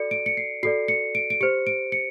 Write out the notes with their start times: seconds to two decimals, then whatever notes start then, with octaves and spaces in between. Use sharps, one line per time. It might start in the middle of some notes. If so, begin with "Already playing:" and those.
Already playing: F#4 A4 D5 C#7
0.11 D7
0.26 C#7
0.37 C7
0.63 F#4 A4 D5 C7
0.88 C#7
1.15 D7
1.30 D7
1.41 G4 C5 C#7
1.67 D7
1.92 C#7